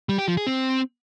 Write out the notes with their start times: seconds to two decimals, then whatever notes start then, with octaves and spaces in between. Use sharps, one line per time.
0.09 G3
0.18 G4
0.28 F3
0.37 G#4
0.47 C4